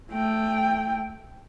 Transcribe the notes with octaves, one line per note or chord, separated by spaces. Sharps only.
A3 G5